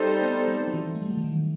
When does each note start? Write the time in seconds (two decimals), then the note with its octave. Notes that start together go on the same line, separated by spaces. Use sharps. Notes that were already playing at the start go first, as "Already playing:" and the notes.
Already playing: G3 C4 D#4 A4 C5
0.22 B3
0.48 G3
0.68 F#3
0.74 E3
0.95 A3
1.02 G3
1.10 F#3
1.17 E3
1.24 D#3